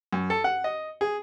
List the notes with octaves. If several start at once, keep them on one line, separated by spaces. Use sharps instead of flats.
F#2
A4
F#5
D#5
G#4